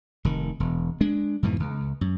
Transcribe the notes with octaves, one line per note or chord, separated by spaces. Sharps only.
F1 D#3
E1
G#3 D4
F2 G#2 B2 E3
C#2
F#2